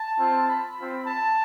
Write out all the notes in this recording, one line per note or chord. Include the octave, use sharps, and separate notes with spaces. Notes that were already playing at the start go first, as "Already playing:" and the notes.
Already playing: A5
C4 F4
B5
C4 F4
A5